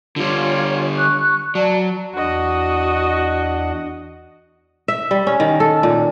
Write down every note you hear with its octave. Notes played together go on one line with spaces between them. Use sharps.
D3 G3 F4 C#5
C#6 F#6
F#3 D5 A5
E2 D4 F#4 D#5 F#5
E5
G3
C#4
D#3
A4
A#2